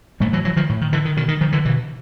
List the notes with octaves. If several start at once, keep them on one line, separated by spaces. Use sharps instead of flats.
A2 G3 A3
E3 F#3
E3 F#3
D#3 F3
A2
D#3
D3 E3
D#3
B2 D#3
D#3
D#3 F3
D3 E3
B2 D3 E3